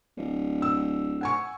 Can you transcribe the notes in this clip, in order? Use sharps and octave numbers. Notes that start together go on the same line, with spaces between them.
D1
E6
F#5 G#5 C#6